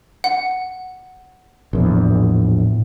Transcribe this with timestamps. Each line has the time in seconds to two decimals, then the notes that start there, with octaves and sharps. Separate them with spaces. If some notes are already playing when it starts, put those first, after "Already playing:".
0.24 F#5
1.73 A#1 E2 A2